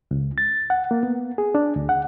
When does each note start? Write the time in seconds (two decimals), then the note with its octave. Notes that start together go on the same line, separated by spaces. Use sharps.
0.11 C#2
0.38 A6
0.70 F#5
0.91 A#3
1.03 B3
1.38 G#4
1.55 D4
1.76 D2
1.89 F#5